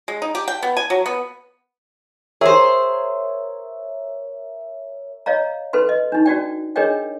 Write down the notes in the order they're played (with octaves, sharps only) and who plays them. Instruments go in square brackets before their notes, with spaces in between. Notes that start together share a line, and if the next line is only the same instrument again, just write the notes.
[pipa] G#3
D#4
G4
G5
B3
G#5
F#3
B3
[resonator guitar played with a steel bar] G#4 C5 [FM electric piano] A#4 C#5 E5
[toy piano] C#5 D#5 F5 A#5
C#4 A4 B4 C6
D#5
D4 D#4
C#4 F#4 D5 G5
D4 G#4 A#4 C#5 D#5 G5